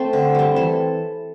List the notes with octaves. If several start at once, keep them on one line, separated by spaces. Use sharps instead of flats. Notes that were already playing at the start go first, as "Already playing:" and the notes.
Already playing: A3 C4 A4 C5
D3
G3 C4
E3 A4